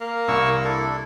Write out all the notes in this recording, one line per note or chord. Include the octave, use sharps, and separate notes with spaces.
A#3
C2 E4 C#6 E6
D4 E4 A4